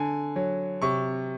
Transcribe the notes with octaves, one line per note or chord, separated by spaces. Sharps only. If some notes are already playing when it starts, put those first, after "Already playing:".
Already playing: D3 G#5
F#3
C3 C#6